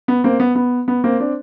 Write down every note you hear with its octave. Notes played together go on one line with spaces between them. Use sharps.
B3
A#3 C4
B3
B3
B3
A#3 C4
C4 D4